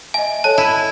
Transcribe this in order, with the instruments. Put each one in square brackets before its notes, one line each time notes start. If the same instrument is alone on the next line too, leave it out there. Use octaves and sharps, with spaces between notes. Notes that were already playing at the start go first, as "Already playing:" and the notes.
[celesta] D#5 E5 [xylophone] G#5
[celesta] A4 C#5 F#6 [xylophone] A5
[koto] E4 [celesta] G#6